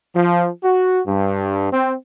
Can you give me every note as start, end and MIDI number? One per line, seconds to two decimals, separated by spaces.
0.14 0.48 53
0.63 0.99 66
1.06 1.68 43
1.71 1.93 60